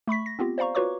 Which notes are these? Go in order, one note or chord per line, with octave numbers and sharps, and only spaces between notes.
A3 B5 C#6 B6
A#6
B3 C4 F4 G4
C5 D5 F5 A#5 C#6
F4 F#4 B4 C#5 C#6 D6